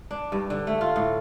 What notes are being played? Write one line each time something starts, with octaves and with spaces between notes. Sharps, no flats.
D4
G2
D3
A3
F4
A2